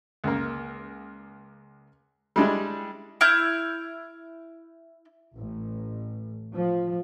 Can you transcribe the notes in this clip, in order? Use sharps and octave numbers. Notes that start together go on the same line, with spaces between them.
C#2 A#3
G3 G#3 D4 E4
E4 F6 G6
A1
F3